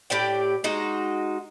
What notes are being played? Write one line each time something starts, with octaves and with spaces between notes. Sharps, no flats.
A2 G4 D5 G5
G#3 D#4 F#4